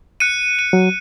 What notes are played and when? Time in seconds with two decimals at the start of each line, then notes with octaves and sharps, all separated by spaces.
0.20 F#6 C#7 D#7
0.59 D#7
0.73 F#3